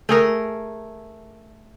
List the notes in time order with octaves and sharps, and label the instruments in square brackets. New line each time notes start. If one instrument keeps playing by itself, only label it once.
[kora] A3 G#4 A#4